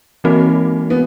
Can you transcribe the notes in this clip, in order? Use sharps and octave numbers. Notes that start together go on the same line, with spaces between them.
E3 G#3 A#3 C4 D#4 F#4
B3